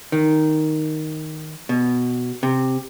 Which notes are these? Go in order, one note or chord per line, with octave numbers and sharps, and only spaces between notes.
D#3
B2
C3